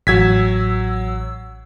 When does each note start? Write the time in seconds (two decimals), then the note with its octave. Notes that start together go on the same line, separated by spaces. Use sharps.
0.07 A1 F#3 E6 G#6 B6